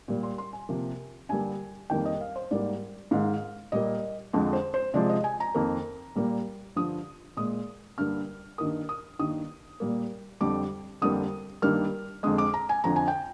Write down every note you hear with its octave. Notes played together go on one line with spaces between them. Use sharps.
A#2 G3 A#3
C6
C6
G#5
C3 F3 A#3
G2 D3 G3 A#3 G#5
F2 D#3 G3 A#3 G5
D#5
F5
C5
G#2 G3 A#3 D5
G#2 D#3 G#3 F5
A#2 G3 A#3 D#5
F2 D3 F3 G#3
C5
C5
C3 F3 G#3 D5
D#5
G#5
A#5
F2 D#3 A#3
A#2 G3 A#3
G2 D3 F3 D#6
A#2 G#3 D#6
G2 D3 G3 A#3 F6
G2 D#3 A#3 D#6
D#6
G2 D#3 A#3 D#6
A#2 G3 A#3
F2 D3 G3 D6
F2 D3 G3 A#3 D#6
G2 D#3 G3 A#3 F6
F2 D3 G#3 D#6
D6
A#5
G#5
F2 D3 F3 A#5
G#5
G5